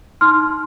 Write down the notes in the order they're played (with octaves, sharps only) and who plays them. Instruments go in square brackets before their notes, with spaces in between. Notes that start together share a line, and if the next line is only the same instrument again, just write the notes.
[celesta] D#4 C6 F6